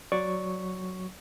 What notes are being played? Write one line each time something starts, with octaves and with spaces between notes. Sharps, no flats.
F#3 D5 C#6